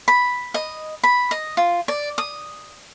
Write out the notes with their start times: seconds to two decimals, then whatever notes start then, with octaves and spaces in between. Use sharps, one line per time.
0.08 B5
0.54 D#5
1.04 B5
1.31 D#5
1.57 F4
1.88 D5
2.18 D#6